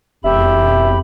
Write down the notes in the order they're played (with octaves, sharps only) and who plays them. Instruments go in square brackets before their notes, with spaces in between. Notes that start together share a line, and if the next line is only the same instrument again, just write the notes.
[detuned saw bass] E1 [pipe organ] F2 B5 [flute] G4 [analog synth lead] E5